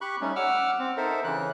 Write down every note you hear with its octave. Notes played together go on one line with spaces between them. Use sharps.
G4 B5 C#6 F#6
G3 A3 C#4 D#4
F#5 D6 E6 F6
C4
D#4 A4 A#4 C5 E5
C#3 E3 F#6